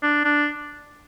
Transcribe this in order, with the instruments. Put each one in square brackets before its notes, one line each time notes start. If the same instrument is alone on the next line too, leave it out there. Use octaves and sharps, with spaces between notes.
[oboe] D4
D4